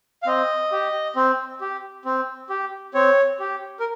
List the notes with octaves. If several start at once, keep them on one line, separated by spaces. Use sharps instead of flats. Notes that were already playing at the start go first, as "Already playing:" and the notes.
F5
C4 D#5
G4
C4
G4
C4
G4
C4 C#5
G4
A#4